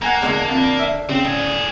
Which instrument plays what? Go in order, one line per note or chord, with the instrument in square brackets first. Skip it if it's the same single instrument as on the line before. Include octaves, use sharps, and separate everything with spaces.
[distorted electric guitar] A#3 [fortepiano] F#5 G#5 A#5
[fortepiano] E2 G#3 [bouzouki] D3 D4
[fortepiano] F2
E5
[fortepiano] C#3 [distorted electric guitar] C4
[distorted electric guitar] A2 G#4 [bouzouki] D3